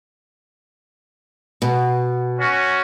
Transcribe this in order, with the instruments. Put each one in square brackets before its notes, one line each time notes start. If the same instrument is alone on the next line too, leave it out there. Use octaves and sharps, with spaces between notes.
[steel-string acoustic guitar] B2
[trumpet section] C#4 F#4